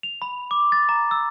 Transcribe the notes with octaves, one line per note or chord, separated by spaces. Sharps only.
F7
B5
D6
A6
A#5
E6